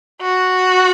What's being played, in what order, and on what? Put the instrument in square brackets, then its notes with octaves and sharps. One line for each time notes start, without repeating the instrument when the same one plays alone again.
[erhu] F#4